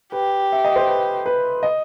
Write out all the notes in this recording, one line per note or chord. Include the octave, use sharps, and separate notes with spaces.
G4 B4
E5
D#5
C5
B4
B4
D#5